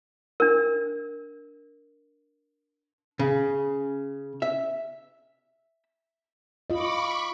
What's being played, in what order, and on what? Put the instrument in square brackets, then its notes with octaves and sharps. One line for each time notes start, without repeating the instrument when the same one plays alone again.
[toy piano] D4 A#4
[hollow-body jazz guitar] C#3
E5
[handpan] F4 D#5 [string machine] B5 C#6 D6